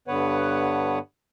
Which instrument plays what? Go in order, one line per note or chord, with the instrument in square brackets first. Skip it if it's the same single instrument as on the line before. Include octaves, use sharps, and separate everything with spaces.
[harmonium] G2 D3 B3 B4 C#5 F#5